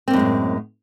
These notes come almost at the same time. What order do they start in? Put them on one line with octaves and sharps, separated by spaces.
C4 A#3 F#2 G#3 A2